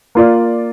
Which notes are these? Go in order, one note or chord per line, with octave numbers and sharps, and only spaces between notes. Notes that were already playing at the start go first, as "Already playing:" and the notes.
A#3 F4 D5